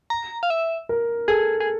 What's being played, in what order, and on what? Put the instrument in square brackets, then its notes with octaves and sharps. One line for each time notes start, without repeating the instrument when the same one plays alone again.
[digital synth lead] A#5
F5
E5
[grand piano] A#4
[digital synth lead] G#4 [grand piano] A4
[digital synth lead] G#4